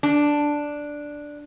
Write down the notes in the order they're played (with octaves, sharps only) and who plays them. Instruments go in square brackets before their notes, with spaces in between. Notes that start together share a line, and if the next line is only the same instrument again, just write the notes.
[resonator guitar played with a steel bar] D4